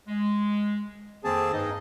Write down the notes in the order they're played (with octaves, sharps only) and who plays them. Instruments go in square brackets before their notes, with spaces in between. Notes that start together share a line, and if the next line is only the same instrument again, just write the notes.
[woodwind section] G#3
[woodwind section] F2 D#3 A#3 [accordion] C4 G#4 A5
[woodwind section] G2 D#5 [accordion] D#4